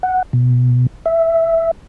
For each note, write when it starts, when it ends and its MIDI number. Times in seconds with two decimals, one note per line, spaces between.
0.03 0.22 78
0.33 0.86 47
1.06 1.71 76